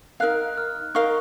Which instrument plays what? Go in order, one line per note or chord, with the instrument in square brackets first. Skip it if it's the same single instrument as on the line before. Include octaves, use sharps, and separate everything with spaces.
[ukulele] D#4 A#4 F5 [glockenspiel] F#6
[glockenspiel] F6
[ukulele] D#4 A#4 F5 [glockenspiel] C#6